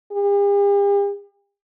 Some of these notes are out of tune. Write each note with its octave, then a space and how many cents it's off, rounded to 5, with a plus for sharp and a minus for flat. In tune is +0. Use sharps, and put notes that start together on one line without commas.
G4 +45